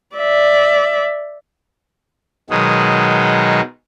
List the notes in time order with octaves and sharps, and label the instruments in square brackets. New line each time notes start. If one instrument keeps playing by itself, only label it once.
[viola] D5 E5
[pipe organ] B2 D#3 F#3 G#3 D#4